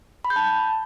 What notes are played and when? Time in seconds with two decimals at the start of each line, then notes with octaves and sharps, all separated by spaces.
0.25 B5
0.30 G6
0.36 A5